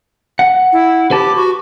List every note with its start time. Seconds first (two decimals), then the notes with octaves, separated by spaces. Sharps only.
0.39 F#5
0.73 E4
1.11 G4 B4 A5
1.36 F#4